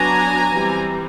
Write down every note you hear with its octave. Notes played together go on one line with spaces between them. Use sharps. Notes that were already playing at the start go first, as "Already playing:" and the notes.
Already playing: F#3 B3 D4 G#5 A#5
E3 G3 C4